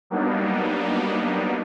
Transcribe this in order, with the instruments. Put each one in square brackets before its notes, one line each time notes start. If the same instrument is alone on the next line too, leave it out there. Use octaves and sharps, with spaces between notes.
[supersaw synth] F#3 G3 A#3 B3 D4 D#4